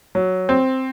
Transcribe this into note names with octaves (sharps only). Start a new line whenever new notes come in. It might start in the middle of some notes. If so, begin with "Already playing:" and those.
F#3
C4